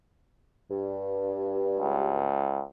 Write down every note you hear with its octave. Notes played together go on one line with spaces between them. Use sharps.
G2
C#2